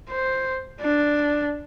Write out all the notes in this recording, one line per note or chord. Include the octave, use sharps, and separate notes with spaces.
C5
D4